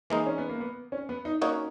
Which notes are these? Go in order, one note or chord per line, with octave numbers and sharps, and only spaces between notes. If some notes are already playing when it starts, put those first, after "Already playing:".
E3 G#3 A#3 D#4
C#4
B3
A#3
B3
C#4
B3
D#4
A#3 C#4 D#4 F#4 C#5